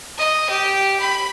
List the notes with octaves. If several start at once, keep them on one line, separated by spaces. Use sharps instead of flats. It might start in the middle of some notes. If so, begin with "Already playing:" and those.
D#5
G4
B5